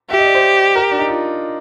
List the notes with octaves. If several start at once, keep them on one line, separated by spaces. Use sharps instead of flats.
G4 E5
D#5
D5
C5
A#4
D4
D#4
F4